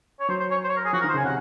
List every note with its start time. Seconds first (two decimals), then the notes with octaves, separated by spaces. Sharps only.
0.20 C#5
0.29 F#3 C5
0.40 C5
0.51 C#5
0.64 C5
0.69 C#5
0.77 A#4
0.85 G#4
0.93 F3 F#4
1.01 A#4
1.04 D#3
1.09 C5
1.14 C#3 G#5
1.24 C3 F#5